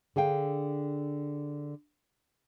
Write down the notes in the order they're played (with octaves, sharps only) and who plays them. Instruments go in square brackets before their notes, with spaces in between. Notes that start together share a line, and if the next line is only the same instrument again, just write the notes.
[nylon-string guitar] D3 G#4 F5 G5